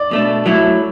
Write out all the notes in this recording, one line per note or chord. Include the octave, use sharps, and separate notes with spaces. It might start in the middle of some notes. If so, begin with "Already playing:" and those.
Already playing: D5
B2 A3 D4
F#3 A3 E4